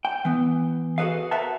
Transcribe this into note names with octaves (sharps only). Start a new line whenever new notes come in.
G5
E3 B3
F#4 G#4 A4 B4 D#5 F5
A#4 B4 E5 F#5 A5